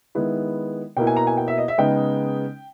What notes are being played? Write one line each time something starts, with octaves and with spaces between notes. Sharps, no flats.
D#3 G#3 B3 E4
B2 A#3 E4 G5
G#5
A#5
G#5
G5
E5
D#5
E5
C#3 G#3 B3 D#4 G5